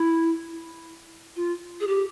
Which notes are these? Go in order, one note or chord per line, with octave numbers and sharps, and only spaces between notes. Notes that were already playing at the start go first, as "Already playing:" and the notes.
Already playing: E4
F4
G#4
G4